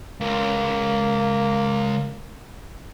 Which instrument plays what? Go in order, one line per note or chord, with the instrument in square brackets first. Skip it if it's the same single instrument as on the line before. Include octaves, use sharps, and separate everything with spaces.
[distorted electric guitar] C#2 [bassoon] A#3